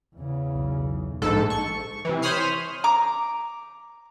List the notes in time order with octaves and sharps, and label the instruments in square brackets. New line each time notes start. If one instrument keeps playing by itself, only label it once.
[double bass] E2 C#3
[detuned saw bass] B1
[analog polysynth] A#1 G#2 A4
C#6
C3 E3
C5 C#5 B5 D#6 F6 C7
[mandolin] A#5 D6